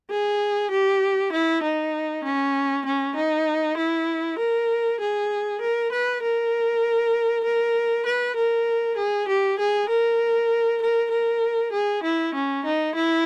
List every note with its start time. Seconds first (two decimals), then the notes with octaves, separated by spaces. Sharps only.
0.10 G#4
0.71 G4
1.33 E4
1.63 D#4
2.24 C#4
2.86 C#4
3.16 D#4
3.77 E4
4.39 A#4
5.01 G#4
5.61 A#4
5.92 B4
6.23 A#4
7.44 A#4
8.06 B4
8.36 A#4
8.97 G#4
9.28 G4
9.59 G#4
9.89 A#4
10.82 A#4
11.11 A#4
11.73 G#4
12.03 E4
12.35 C#4
12.65 D#4
12.95 E4